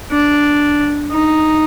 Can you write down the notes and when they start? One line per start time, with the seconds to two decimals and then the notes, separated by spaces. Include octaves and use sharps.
0.11 D4
1.11 D#4